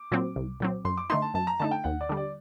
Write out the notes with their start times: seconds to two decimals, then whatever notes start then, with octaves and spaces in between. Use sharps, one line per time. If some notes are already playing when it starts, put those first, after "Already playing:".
Already playing: D6
0.11 A#2 F#3 C4
0.36 C2
0.60 A#2 F#3 C4
0.85 F#2 C6
0.98 D6
1.10 D3 A3 D#4 C6
1.22 A5
1.34 F#2 A5
1.47 A#5
1.59 D3 A3 D#4 A5
1.71 G5
1.84 D#2 F#5
2.01 D5
2.09 D3 G3
2.17 D5